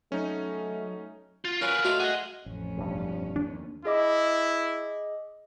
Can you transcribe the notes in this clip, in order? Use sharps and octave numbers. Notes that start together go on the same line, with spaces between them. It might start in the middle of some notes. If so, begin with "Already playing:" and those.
F#3 A3 C#4 D#4
F4
F#3 C#4 A#4 B4 F5
A3 D#4 F4 F#4
G#4 D#5 F#5
A1 F2 A3 C#4
E1 G2
D#2 D4
E4 G#4 D#5 D6